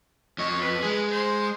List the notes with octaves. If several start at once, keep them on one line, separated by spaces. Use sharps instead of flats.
F2 C#5 D#5
B4
G#3 G#4
C5